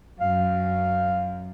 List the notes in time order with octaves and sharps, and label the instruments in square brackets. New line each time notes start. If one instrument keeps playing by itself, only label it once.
[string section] F#2 [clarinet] F5